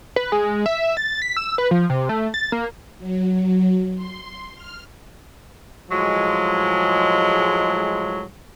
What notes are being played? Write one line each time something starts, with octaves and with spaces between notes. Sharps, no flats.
B4
G#3
E5
A6
B6
E6
B4
F3
C3
A3
A6
A#3
F#3
C6
F6
A2 F3 F#3 G#3